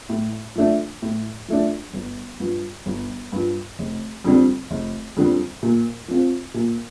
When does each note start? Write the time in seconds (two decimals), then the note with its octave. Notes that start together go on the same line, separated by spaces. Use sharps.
0.09 A2
0.55 F3 A3 D4
1.02 A2
1.48 F3 A3 D4
1.94 G1
2.40 G2 F3
2.86 G1
3.32 G2 F3
3.79 F1
4.24 F2 D3 G3 C4
4.71 F1
5.17 F2 D3 G3 C4
5.63 A#2
6.08 F3 C4 F4
6.54 A#2